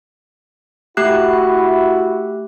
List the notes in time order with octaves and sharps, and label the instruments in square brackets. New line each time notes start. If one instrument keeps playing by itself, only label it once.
[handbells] A3 G4 F#6 [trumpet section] E4 F#4